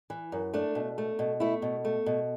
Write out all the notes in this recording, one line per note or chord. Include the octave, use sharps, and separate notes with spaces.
E3
F#2
A3 D4
B2
A3
B2
A3 E4
B2
A3
B2